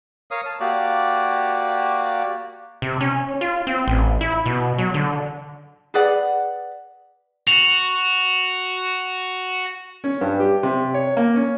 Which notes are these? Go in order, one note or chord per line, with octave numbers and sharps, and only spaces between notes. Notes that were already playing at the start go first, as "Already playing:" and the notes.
A#4 C#5 F5 D#6
A5
A#3 F#4 G4 D5
C3
C#4
F4
C4
A1
E4
B2
F#3
D3
G#4 B4 D5 F#5
F#4 F7
C#4
G2
G4
C3
C#5
A#3
C#4